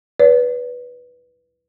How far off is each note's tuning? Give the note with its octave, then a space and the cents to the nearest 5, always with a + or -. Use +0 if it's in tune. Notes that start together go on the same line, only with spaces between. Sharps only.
B4 -10 D5 -45